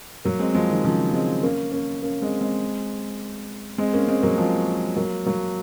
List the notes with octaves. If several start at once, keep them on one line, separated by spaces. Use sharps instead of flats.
F#3 A#3
G#3 C4
F3 G#3
D#3
C#3 F3
G#3 C4
A#3 C#4
A#3 C#4
A#3 C#4
G#3 C4
G#3 C4
G#3 C4
A#3 C#4
G#3 C4
F#3 A#3
F3 G#3
F#3 A#3
F#3 A#3